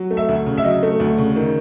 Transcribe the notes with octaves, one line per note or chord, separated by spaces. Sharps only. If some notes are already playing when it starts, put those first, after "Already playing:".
Already playing: F#3
A3
E5
D2
C#3
E5
F#3 D#5
A3
D2
C#3
D#3